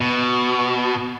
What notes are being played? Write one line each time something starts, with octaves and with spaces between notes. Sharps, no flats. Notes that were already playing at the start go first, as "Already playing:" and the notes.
B2